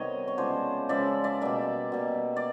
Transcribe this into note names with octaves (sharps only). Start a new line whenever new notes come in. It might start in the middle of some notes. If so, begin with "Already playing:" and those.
Already playing: C3 D#3 G3 B3 C#5 D#5
C#5
C#3 F3 G#3 B3 C5 D5
C#3 F3 G#3 B3 D5 E5
D5 E5
B2 G3 A#3 D5 E5
B2 G3 A#3
D5